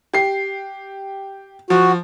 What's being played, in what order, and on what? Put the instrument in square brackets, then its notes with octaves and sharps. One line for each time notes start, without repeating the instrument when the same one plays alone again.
[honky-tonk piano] G4 C7
[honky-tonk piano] F3 [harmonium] F#4